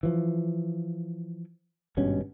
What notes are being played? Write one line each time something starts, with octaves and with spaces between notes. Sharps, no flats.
E3 F3
G#1 G2 B2 C#4